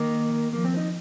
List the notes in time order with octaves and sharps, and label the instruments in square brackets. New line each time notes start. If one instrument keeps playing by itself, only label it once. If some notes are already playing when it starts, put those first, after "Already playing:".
Already playing: [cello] D#3 [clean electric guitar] A#3
[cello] F3 [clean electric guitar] A#3
[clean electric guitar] C4
D#4